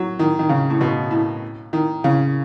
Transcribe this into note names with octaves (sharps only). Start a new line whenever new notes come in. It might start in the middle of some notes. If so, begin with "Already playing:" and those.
Already playing: F#3
D#3
D#3
C#3
A2
B2
A2
D#3
C#3